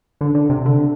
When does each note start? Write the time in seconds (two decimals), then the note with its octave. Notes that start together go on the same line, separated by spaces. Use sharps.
0.21 D3
0.35 D3
0.50 C3
0.66 D3